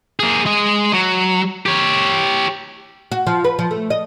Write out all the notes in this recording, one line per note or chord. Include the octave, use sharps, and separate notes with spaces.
A#3 G#4
G#3 D#5
F#3
G4 C#5
F#4
F3
B4
F3
A3
D#5